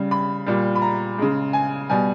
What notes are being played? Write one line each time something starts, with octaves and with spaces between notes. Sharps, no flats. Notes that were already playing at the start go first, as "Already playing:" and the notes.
Already playing: C#3 G3
B5
A#2 G3
B5
A#5
C#3 G#3
G#5
B2 G3 G#5